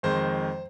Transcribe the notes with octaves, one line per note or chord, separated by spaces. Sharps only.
F2 D#3 G#3 C5